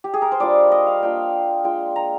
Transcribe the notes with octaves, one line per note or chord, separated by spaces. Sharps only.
G4
G#4
A#4
C5
G3 D4 F4 D5
D#5
F5
A#3 D4 F4 G5
G#3 D4 F4 G5
A#5